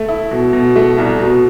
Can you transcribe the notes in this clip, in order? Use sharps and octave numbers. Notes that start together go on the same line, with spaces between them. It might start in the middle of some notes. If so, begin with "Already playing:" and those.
Already playing: A3
E4
B2
B2
A3
C2
B2